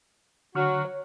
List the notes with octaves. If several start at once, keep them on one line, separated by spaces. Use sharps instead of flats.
D3 F#3 F#4 C#6 F6
C#5